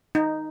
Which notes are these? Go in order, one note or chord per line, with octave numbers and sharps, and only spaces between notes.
D#4